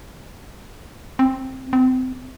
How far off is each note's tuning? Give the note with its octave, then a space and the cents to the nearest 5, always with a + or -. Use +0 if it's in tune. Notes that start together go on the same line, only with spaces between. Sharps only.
C4 +5
C4 -30